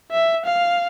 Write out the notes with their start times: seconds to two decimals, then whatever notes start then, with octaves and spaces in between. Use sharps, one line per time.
0.12 E5
0.46 F5